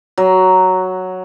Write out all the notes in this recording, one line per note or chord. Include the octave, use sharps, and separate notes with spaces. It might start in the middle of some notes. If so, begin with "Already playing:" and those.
F#3